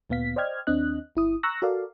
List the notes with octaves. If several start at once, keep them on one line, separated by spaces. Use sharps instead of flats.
D2 A#2 B3 F5 B6
C5 D5 D#5 G5 F6 G#6
D#2 C4 D4 D#5 F#6
G1 E4 D#6
A#5 C#6 E6 F#6 A#6
F#4 A4 A#4 D5 F5